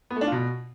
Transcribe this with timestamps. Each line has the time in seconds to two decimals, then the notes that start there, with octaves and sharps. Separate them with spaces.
0.11 B3
0.16 A3
0.21 D4
0.27 F4
0.32 B2